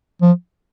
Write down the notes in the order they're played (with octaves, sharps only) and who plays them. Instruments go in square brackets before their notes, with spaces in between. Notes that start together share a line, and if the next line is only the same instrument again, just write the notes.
[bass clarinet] F3